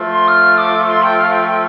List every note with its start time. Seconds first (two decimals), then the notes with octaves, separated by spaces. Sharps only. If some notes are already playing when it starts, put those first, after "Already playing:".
Already playing: F3 A3 F4
0.09 C6
0.28 F6
0.58 D6
0.88 C6
1.03 G5
1.18 F5
1.32 G5
1.47 G5